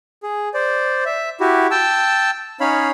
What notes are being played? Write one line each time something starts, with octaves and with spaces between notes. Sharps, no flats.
G#4
C5 D5
E5
E4 F#4 G4
G5 A5 E6
C#4 D#4 C#5 F5 B5